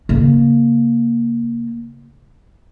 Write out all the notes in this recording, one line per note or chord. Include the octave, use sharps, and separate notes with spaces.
C#3 A#3